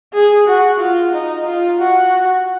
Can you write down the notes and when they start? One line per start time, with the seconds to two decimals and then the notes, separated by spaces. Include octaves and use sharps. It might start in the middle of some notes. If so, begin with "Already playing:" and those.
0.13 G#4
0.47 F#4
0.79 F4
1.13 D#4
1.46 F4
1.79 F#4